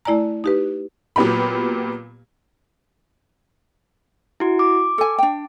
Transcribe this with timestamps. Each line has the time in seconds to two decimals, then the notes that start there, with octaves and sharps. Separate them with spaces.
0.05 A3 E4 D5 G#5 A#5
0.44 D#4 G4 B4
1.16 A#2 F#3 B3 G4 B5
4.40 E4 F#4
4.59 D6
4.98 A4 G#5
5.18 D4 G5